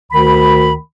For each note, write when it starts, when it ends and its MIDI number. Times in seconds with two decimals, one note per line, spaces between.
0.12 0.74 38
0.12 0.74 51
0.12 0.74 83